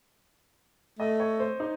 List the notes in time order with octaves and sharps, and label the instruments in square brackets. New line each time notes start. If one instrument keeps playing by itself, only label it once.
[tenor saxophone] A3 [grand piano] D#5
[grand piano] C#5
C5
D#4